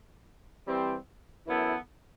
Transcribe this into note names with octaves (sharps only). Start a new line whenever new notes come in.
E3 G3 C4
F#2 E3 B3 E4 A4